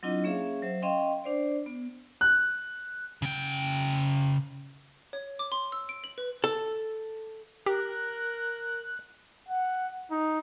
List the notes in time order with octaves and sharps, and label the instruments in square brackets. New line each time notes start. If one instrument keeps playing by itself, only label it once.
[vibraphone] F#3 C4 D4 E4 F4 D#5
A#3 C#4 G#4 C#5 E5 F5
F#3 C5 E5
C#4 D#5 F5 G5 C6
D4 C5 D5
B3
[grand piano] F#6
[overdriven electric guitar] C#3 G5
[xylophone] C#5
D6
C6
E6
D7
F#7
B4
[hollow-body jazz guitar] A4
[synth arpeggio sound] G4 [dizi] A#4 [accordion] F#6
[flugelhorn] F#5
D#4